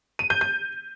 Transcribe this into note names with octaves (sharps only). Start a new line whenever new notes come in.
D#7
G6
G6